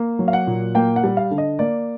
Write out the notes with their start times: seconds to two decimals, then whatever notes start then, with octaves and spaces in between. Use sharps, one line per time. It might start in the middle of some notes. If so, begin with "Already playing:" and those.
Already playing: A#3
0.19 F#3
0.28 F5
0.33 F#5
0.47 A#2
0.75 A#3 G5
0.96 F#5
1.04 G3
1.17 F5
1.31 D3
1.38 D#5
1.59 A#3 D5